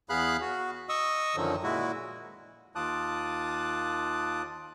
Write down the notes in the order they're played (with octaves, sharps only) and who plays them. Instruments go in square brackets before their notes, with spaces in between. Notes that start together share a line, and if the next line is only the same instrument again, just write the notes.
[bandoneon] E2 B3 G#4 F5 B5 F#6
F#4
D#5 C#6 D#6 E6
F#2 D3 D#3 F3 F#3
A#2 G#3 E4 F#4
D#2 F4 A5 D6 D#6 F#6